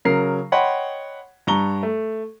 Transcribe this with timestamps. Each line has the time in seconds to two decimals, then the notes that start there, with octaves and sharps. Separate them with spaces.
0.05 C#3 F#3 A#4 C7
0.52 C#5 D#5 F#5 G5 B5 C6
1.47 G2 A#5 C#6 G7
1.83 A3